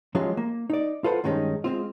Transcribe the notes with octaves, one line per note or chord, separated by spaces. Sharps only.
F3 F#3 G#3 C#4 F4 G4
A#3
D#4 D5
F4 A4 B4 C5 F#5
G2 D#3 G#3 C#4 D#4
G#3 C4 F4